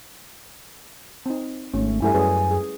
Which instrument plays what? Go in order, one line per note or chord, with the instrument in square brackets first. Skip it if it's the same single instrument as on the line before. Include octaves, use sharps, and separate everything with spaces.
[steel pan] C4 D#4
[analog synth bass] G#1 [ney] A3 [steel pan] C#4
[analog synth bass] G2 [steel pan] G3 A3 E4 [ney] G#5
[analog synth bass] F#2 [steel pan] C#4 G#4 B4
[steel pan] G#4